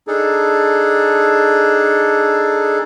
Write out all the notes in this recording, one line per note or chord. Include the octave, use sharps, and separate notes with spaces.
D4 D#4 G#4 A4